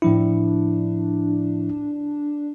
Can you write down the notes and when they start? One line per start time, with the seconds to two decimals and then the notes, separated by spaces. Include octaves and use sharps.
0.02 A2 F3 D4 E4